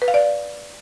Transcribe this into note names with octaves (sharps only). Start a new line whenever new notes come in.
B4
F5
D5